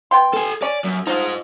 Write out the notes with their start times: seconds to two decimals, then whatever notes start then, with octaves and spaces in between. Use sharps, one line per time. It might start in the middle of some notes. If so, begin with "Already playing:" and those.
0.11 B3 G5 C6
0.34 A4 G#5
0.63 C#4 D5
0.85 F#2
1.07 F3 D#4 C5